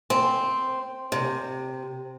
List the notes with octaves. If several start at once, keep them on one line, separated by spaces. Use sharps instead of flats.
C4
C3